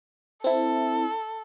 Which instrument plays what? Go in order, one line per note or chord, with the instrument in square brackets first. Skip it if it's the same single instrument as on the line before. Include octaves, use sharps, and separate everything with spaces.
[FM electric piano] C4 E4 [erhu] A4